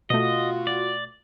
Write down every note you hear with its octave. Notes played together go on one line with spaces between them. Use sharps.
B2 A3 F4 F#4 D#5
D5